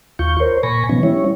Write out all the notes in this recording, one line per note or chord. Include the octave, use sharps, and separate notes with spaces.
D#2 F4 C#6 G6
A#4 C5 C#5
A#2 G#5 B5 C#6 A#6
B2 D#3 F3 B3 C#4
G3 C#4 E4 C#5